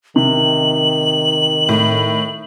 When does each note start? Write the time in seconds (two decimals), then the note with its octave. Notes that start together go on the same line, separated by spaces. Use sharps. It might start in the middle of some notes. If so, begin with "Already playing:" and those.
0.16 C3 D#3 F#7
1.69 A2